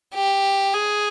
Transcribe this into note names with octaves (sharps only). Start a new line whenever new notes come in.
G4
G#4